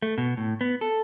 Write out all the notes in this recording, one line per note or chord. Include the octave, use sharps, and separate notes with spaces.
A3
B2
A2
B3
A4